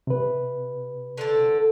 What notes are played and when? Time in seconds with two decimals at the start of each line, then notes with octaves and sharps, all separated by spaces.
0.07 C3 B4
1.17 D3 C4 A4